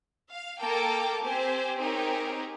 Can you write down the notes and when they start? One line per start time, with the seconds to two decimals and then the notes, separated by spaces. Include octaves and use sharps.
0.30 F5
0.61 A#3 A4 A#4 G5 A5 D6
1.25 C4 G4 C5 G#5
1.79 C4 D#4 G4 G#4 A#4 C#5